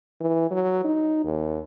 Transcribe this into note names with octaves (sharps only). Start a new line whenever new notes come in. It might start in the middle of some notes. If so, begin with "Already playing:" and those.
E3
F#3
D#4
D#2